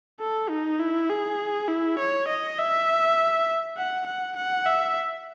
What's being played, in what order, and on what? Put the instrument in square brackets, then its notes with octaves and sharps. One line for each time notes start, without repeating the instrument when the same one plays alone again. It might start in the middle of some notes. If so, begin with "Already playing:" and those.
[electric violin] A4
D#4
E4
G#4
E4
C#5
D#5
E5
F#5
F#5
F#5
E5